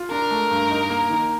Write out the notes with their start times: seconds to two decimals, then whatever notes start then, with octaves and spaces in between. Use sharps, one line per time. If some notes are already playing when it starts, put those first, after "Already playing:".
Already playing: F4
0.11 D4 A#4
0.31 A3
0.51 G2
0.70 D#4
0.90 A#3
1.10 D#3